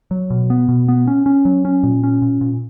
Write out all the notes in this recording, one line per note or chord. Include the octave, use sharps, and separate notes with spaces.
F#3
B2
B3
B2
B3
C#4
C#4
F#3
C#4
A#2
C#4
A#2
A#2